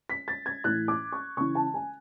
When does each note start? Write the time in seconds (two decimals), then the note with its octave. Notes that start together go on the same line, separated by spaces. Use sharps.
0.10 B6
0.28 A6
0.46 G#6
0.64 A2 E3 F#6
0.88 D6
1.12 C#6
1.37 C#3 E3 C#6
1.55 A5
1.74 G#5